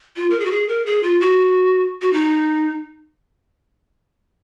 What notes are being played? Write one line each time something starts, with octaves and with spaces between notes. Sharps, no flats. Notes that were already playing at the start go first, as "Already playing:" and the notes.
F4
A#4
G#4
F#4
G#4
A#4
G#4
F4
F#4
F#4
D#4